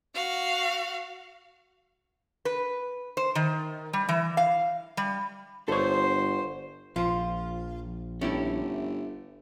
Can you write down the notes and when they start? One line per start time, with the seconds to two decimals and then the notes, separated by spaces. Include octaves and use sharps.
0.15 F#4 F5
2.45 B4
3.17 C5
3.35 D#3
3.93 G3
4.09 E3
4.37 F5
4.97 G3
5.68 G1 A4 C5 C#5
6.96 A#1 F3 F4 C5
8.21 G1 A3 C#4 E4 G4